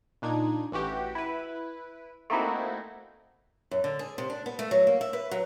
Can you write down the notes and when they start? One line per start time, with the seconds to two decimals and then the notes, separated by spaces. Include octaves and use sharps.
0.22 A#2 D4 D#4 G#6
0.72 A1 E3 F#4 G4
1.15 E4 B4
2.30 A3 A#3 C4 D#4 E4 F#4
3.71 F#2
3.84 D3
3.99 G#4
4.18 C3
4.30 D4
4.46 B3
4.59 A3
4.71 F#3
4.87 A#3
5.01 E5
5.13 B4
5.31 F#3